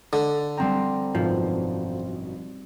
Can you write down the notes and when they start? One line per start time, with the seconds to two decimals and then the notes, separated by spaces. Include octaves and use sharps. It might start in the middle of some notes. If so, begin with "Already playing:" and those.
0.13 D3
0.58 G3 C4 G5 A#5
1.15 G#1 F#2 B2 F3